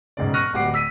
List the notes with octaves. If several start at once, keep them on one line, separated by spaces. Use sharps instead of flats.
E1 G#2 C#3 D5
C#6 F6 F#6 A#6 D#7
D1 G3 F#5 D6 C7
E6 B6 D#7